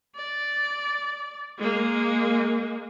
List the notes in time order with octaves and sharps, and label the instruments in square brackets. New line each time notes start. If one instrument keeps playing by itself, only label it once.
[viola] D5
G#3 A#3